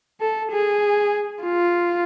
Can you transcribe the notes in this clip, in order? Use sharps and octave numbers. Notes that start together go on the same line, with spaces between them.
A4
G#4
F4